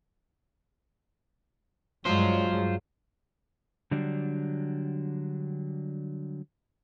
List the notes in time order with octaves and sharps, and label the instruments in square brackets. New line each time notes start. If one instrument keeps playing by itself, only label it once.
[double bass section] G2 F#3 G#3 [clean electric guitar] F4 C5
[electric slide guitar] D3 F#3 G3 D4